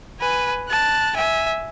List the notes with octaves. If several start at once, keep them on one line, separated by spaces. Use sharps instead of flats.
B4 G#5
A5 F#6
E5 G#5